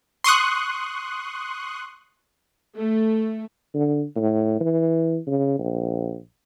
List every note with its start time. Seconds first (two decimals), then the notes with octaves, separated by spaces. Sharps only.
0.24 C6 C#6 D#6 F#6
2.77 A3
3.75 D3
4.16 A2
4.60 E3
5.27 C#3
5.59 A#1